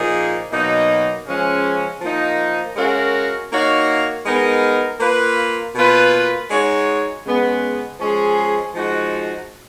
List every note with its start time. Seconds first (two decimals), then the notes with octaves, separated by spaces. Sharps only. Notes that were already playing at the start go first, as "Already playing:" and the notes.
Already playing: A#2 F3 A#3 D#4 G#4
0.51 B2 F#3 A#3 D#4
1.27 C#3 F3 G#3 C#4
2.01 F3 A#3 D#4
2.76 G#3 C#4 F#4 A#4 F5
3.51 A#3 D#4 F#4 C#5 F5
4.25 G#3 B3 D#4 A#4
5.00 A#3 F4 B4
5.75 B2 A#3 F4 B4
6.50 G#3 D#4 F#4 C#5
7.25 C#3 G#3 B3
8.00 F3 G#3 C#4 G#4
8.75 F3 G#3 D#4 F#4